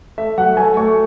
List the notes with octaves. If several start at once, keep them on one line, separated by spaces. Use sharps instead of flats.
A3 E5
F#3 F#5
A3 G#5
A3 C#6